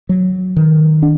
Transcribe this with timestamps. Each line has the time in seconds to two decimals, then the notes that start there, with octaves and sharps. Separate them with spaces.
0.09 F#3
0.57 D#3
1.02 D4